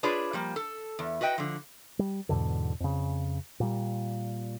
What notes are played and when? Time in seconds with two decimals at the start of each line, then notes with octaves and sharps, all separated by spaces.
0.03 D4 F4 G#4 B4 C#5 D5
0.33 F3 G3 A#3
0.56 A4
0.99 E2
1.21 F#4 B4 D#5 G5
1.38 D3 F3
1.99 G3
2.29 E2 G#2 B2 D3
2.80 F2 C#3
3.60 A#2 G3